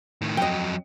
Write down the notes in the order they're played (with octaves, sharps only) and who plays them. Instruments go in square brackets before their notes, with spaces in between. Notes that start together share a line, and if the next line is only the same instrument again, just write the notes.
[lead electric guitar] A2 D#3
[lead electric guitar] F2 F#3 [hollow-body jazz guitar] D#5 G5